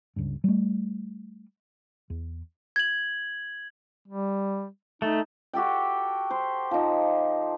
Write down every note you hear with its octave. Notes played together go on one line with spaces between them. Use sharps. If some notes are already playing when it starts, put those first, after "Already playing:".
G1 C#2 G2
G3 A3
E2
G#6 F#7
G3
A3 D#4
F#4 G4 A4 G5
C5
F3 D#4